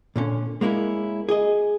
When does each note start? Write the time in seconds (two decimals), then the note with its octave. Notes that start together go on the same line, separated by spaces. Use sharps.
0.16 A#2 D3 C#4
0.61 G#3 A#3 C#4 E4
1.29 G#4 D#5